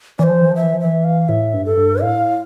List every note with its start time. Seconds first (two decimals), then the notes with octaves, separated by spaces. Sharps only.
0.19 E3 C5 D5
0.30 F3
0.41 E3
0.51 F3 E5
0.62 E3
0.73 F3
0.80 E3 E5
1.04 F5
1.29 A2 E5
1.54 G2
1.65 A4
1.77 G2
2.02 A2 F5